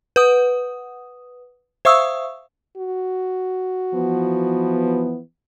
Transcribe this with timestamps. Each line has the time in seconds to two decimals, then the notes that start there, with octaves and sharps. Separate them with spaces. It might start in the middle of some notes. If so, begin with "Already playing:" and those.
0.16 B4 F#5 D#6
1.85 C5 E5 F5 C#6 D#6 E6
2.77 F#4
3.94 E3 F3 B3